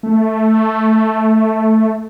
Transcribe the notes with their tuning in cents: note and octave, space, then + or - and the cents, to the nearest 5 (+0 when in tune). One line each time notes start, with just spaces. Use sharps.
A3 +0